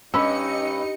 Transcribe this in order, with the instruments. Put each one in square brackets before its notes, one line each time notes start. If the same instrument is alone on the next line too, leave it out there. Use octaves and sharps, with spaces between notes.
[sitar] G2 [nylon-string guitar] C#4 [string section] D#4 D#5 C#7 [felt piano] B5 E6